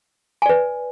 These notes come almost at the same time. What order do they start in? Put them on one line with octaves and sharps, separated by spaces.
G#5 D5 B4